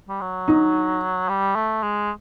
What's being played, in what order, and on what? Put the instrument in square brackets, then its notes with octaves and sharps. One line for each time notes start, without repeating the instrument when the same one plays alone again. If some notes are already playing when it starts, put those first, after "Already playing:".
[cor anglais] G3
F#3
[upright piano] D#4
[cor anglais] G3
A3
G#3